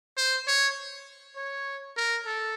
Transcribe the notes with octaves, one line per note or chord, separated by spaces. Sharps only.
C5
C#5
C#5
A#4
A4